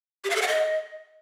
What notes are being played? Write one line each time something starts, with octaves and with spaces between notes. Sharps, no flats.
G4
F5
A4
F#5
D#5